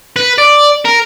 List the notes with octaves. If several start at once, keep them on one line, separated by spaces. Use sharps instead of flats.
B4
D5
A#4